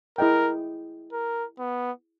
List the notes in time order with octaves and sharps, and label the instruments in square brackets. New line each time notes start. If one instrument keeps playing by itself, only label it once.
[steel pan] E4 G#4 D#5 G5 [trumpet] A#4
[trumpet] A#4
B3